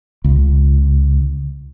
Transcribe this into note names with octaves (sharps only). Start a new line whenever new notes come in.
C#2